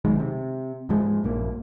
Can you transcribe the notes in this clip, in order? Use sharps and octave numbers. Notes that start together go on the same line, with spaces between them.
B1 D#3 G#3
C3
G#2 F3 G#3
A#1 G2 A#3